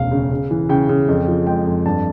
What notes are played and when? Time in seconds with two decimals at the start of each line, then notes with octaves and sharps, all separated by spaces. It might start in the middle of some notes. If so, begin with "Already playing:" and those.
Already playing: E1 D2 C#3 A3 F5
0.11 C#3
0.31 C#3
0.51 E3
0.69 C#3 G5
0.89 C#3
1.08 F2
1.28 F3
1.47 G#3 G5
1.67 F2
1.86 G2 A5